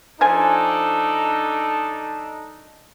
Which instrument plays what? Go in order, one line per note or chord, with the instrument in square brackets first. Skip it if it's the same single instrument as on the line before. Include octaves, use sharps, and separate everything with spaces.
[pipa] F3 G#5 [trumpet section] D4 D#4 A4